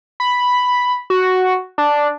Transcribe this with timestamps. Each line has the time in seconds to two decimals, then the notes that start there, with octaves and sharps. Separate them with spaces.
0.20 B5
1.10 F#4
1.78 D4